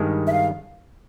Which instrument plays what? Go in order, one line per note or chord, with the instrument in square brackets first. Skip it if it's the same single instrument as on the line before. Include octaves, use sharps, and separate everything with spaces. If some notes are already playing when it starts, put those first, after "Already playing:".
Already playing: [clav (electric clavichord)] G2 D#3 G#3
[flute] E5
F5